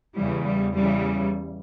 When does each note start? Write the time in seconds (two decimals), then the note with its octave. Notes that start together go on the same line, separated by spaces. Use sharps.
0.16 E2 C#3 E3 G3
0.45 G3
0.74 E2 C#3 E3 G3